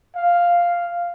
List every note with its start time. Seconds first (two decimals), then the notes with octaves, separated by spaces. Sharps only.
0.16 F5